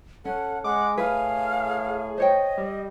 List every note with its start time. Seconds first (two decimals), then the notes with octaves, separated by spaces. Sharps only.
0.25 C#4 A4 F#5
0.64 G#3 F#5 D6
0.97 A2 G#4 B4 F5
2.18 C5 C#5 D#5 G5
2.58 G3